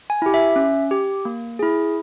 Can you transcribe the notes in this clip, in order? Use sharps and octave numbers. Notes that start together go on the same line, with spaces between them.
G#5
E4 G4
E5
C#4
G4
A#3
E4 G#4